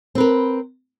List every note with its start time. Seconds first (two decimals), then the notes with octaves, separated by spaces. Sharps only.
0.15 C4
0.18 B4
0.20 A#4